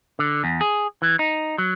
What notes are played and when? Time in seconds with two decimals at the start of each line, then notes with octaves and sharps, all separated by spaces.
0.19 D3
0.44 E2
0.61 G#4
1.02 E3
1.19 D#4
1.58 F#3